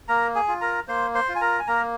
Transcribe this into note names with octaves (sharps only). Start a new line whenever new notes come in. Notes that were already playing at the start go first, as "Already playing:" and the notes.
A#3 A#4 A#5
G#4 G#5
F4
A#4 A#5
A#3 C5 C6
C5 C6
F4
G#5
A#4 A#5
G#5
A#3 A#4 A#5